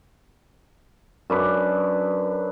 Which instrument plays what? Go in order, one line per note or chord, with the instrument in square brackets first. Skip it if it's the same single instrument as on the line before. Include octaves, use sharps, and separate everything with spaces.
[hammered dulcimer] F#2 D4 B4